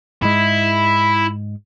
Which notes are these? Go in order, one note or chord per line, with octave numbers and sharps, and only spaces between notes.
G#2 G#3 E4